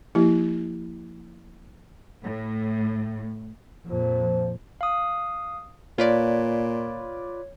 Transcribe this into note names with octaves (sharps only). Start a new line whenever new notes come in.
F3 A#3 E4 G4
A2
F2 A#2 F3
F5 D#6
A#2 F4 B4 C#5 D5